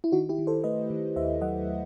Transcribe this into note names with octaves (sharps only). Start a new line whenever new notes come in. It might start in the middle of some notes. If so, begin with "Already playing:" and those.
E4
D#3 D#4 F#4
E4 G4
D#3
A4 C5
A3 B4 D#5
D#3
D#2 C5 E5
F#3 D#5 F#5